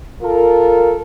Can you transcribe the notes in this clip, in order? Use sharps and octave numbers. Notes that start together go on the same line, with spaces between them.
F4 A4 A#4